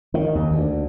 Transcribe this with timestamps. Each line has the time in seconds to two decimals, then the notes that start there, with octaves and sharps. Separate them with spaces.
0.14 D#3
0.35 D#2
0.51 D2